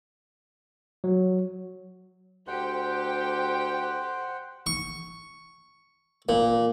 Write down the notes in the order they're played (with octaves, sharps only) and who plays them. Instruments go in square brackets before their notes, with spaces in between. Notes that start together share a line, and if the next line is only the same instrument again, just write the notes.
[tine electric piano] F#3
[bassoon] D2 [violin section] G4 G5 [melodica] C5 F#5
[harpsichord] C#6
A#2